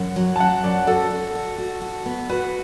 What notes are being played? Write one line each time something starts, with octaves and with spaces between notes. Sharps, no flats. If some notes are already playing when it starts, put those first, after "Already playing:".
Already playing: F#2 F#5
F#3
A5
F#3 F#5
F#2 D5
F#4 A4
F#4
F#4
F#4
F#4
B3
F#4 B4